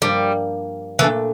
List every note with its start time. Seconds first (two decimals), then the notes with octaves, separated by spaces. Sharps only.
0.01 G2 F3 G3 A#3
0.99 A#2 E3 A3 D4 A4